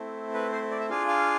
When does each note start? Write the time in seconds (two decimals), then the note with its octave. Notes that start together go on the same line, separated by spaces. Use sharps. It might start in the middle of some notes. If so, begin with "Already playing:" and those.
Already playing: A3 C4 E4
0.34 B4
0.53 C5
0.71 D5
0.80 E5
0.89 D4 F4 G#4 F5
1.08 F5